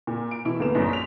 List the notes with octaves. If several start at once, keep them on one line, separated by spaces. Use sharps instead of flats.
A#2
D7
B2 E3 E4
D2 A#3 B3 E7
A#1 F#2
B6 F7